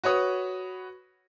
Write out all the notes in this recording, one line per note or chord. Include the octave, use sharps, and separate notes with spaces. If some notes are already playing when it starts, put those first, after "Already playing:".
F#4 B4 C#5 D#6